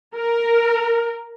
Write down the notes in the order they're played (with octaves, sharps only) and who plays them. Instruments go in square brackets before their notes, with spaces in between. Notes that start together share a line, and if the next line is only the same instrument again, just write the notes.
[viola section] A#4